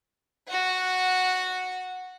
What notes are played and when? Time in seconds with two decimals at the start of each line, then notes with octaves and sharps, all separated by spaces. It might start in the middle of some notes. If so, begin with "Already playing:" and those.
0.48 F#4 F#5